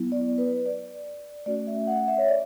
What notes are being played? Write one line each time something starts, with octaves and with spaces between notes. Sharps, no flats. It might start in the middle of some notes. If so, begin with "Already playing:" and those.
Already playing: F#3 B3 E4
D5
B4
D5
A3 C#4 F#4 D5
E5
F#5
E5
C#5
D5